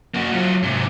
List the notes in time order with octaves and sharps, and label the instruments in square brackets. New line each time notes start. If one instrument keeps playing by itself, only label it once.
[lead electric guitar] A#3 F#4
F#3 F4
G#2 C3